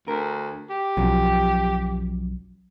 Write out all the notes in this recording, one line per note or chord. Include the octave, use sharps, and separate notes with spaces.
D2 A#4
G4
B1 F#2 F3 F#3